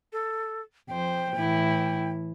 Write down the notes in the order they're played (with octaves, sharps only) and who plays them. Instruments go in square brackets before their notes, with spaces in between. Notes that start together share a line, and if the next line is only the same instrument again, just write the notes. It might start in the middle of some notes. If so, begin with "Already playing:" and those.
[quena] A4
[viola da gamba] F2 C5 [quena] G5
[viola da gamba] A2 E3 E4